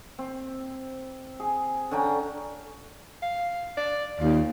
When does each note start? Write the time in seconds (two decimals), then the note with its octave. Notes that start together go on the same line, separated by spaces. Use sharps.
0.19 C4
1.40 G#4
1.91 D3 C#4 G5 A#5
3.22 F5
3.77 D5
4.20 D#2 F4